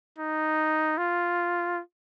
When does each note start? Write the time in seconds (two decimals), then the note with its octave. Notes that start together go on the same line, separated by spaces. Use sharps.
0.18 D#4
0.98 F4